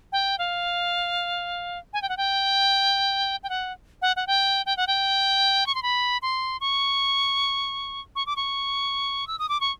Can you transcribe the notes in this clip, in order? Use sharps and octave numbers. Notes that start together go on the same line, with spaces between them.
G5
F5
G#5
G5
F#5
G5
G5
F#5
F#5
F#5
G5
G5
F#5
G5
C#6
C6
B5
C6
C#6
C#6
D6
C#6
E6
D#6
D6
C#6